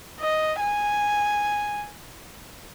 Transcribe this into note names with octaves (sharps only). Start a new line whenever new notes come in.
D#5
G#5